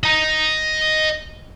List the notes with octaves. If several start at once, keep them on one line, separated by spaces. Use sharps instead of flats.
D#5 A#5